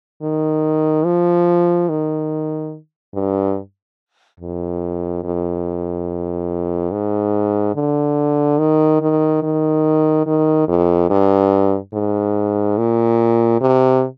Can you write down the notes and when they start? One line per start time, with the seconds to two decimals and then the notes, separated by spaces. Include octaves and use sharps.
0.22 D#3
1.05 F3
1.89 D#3
3.14 G2
4.40 F2
5.24 F2
6.91 G#2
7.75 D3
8.59 D#3
9.01 D#3
9.43 D#3
10.26 D#3
10.68 F2
11.10 G2
11.94 G#2
12.78 A#2
13.61 C3